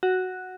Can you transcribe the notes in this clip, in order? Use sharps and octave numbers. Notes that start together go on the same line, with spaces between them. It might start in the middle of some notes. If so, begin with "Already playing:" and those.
F#4